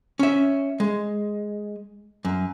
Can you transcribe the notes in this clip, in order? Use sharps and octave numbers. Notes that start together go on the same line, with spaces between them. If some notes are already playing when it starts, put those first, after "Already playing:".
C#4 E5
G#3
F#2